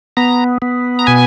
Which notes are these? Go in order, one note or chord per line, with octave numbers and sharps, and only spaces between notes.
B3 A#5
B3
A#5
B2 G#5